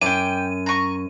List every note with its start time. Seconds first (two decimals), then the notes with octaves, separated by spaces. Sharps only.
0.01 F#2 G5 D6 D#7
0.66 A#5 C#6